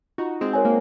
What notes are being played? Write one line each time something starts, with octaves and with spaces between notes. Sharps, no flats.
D#4 F4 F#4
G#3 C4
A#4 C#5 G#5
A#3